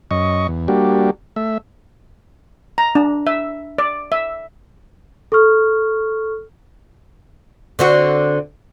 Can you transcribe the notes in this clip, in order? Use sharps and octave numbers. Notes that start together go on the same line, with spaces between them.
F#2 D#5 C#6
E2
G3 A#3 D4 F#4 G4
A3 E5
A#5
D4
E5
D5
E5
A4 C#6 F6
D3 C4 F#4